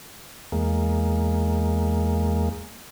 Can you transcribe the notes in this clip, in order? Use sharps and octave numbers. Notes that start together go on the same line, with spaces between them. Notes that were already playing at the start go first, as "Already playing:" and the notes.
E2 G#3 A#3